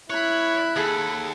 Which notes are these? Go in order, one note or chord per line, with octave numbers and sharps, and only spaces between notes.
E4 C#5 B5 F#6
D#2 G#4 A4